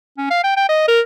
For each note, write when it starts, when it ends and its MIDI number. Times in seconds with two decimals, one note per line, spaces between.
0.18 0.27 61
0.30 0.40 77
0.44 0.57 79
0.57 0.65 79
0.69 0.83 75
0.88 1.01 70